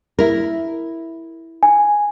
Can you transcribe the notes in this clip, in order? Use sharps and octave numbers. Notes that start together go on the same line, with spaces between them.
E4 A#4
G#5